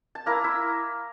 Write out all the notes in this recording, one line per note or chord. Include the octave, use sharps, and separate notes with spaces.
A5
A#3 E4 A#4 A#5
E4 E5